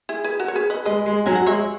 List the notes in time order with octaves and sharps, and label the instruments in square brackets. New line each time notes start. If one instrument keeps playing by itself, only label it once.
[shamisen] E4 G#4
G#4 B4
F#4 A#4
C#5
G#4 B4
B4 D#5
[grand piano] G#3 [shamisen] B4 D#5
[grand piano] G#3
[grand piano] F#3 [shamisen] G#5
[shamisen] F#5
[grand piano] G#3 [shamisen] C#5 E5